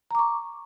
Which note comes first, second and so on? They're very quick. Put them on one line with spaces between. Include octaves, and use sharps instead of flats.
A#5 D6 C#6